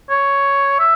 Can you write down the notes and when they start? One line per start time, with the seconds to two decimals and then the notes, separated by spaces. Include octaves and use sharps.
0.10 C#5
0.80 E5